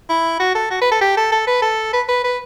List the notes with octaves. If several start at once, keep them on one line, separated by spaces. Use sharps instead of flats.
E4
F#4
A4
F#4
B4
A4
G4
A4
A4
B4
A4
B4
B4
B4